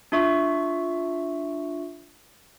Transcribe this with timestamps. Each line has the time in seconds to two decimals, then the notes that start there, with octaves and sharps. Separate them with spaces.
0.12 D4 F4 E5 C#6